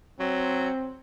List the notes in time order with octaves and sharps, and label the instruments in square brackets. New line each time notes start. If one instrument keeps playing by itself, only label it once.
[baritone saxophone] F#3 [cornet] C4